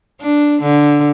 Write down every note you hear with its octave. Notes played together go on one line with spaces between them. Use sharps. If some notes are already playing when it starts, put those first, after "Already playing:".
D4
D3